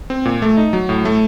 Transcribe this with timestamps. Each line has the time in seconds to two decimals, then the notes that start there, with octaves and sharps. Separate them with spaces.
0.10 C4
0.25 A#2
0.42 A3
0.57 D#4
0.73 F#3
0.89 A2
1.05 A3